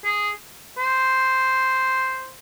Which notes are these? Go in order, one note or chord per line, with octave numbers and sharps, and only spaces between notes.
G#4
C5